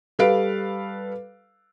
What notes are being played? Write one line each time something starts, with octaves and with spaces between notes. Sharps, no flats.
G3 A4 B4 F5 D7